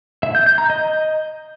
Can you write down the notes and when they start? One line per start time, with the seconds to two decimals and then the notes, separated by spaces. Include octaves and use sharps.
0.23 E5
0.35 G6
0.46 G6
0.58 A#5
0.70 D#5